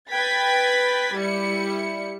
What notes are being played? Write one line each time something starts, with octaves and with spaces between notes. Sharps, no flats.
B4 G5 G#6 A6 B6
G3 E4 C#7